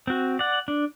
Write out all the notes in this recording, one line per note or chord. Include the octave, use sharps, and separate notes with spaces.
C4 F#4
D5 F#5
D4